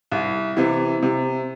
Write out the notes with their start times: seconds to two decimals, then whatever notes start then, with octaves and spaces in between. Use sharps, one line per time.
0.11 C2
0.57 C3 E3
1.03 C3